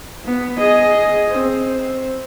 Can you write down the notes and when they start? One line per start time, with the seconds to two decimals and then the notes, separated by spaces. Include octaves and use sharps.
0.24 B3
0.58 G#4 D#5
1.30 C4